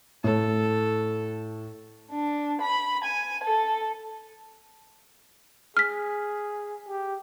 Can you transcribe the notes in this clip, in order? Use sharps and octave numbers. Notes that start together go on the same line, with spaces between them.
A2 A4
D4
B5
G#5
A4
G#4 F6 B6
G4